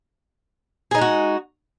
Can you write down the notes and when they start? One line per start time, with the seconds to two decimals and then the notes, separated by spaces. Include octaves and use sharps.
0.91 G#4
0.95 D#4
0.98 G#3
1.01 F#4